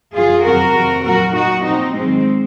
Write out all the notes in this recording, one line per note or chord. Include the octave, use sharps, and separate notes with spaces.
F#2 C#3 F3 F4 G#4
F2 C3 D#3 F#3 F#4 A#4
F2 C3 F3
A#2 F#3 F#4 A#4
A#2 F#3 D#4 F#4
A#2 F3 C4 D#4
G#2 D#3 F#3 G#3 C4